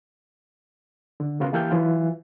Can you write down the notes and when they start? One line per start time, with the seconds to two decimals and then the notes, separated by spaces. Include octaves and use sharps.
1.20 D3
1.40 C#3 B3 F4 F#4 A#4
1.53 E3 A#3 G4 A4 F6 G6
1.71 E3 F#3 F4